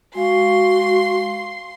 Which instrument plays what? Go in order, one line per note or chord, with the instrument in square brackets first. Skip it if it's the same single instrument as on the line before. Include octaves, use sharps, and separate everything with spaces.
[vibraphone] G#3 F5 [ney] F#4 [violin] C6